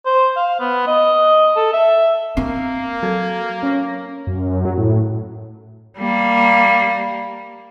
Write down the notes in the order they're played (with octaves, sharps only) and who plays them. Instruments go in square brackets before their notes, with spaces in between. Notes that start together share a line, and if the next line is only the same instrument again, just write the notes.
[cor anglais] C5
F5
B3
D#5
A4
E5
[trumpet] A#3 [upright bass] C4 [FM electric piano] C7
[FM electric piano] F#3 A4 G#6
C#4 C#5 A#6
[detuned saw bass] F#2
F#3
A2
[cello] G3 A#3